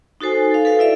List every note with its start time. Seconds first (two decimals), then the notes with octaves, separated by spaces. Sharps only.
0.21 D#4 F#4 A4 C5 G#5
0.51 A4 F5
0.65 A4 B4 F5
0.79 E4 D5 E5